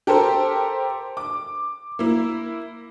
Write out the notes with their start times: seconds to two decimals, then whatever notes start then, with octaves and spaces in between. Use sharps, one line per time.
0.07 G4 A4 A#4 C5
1.17 D6
1.99 A#3 E4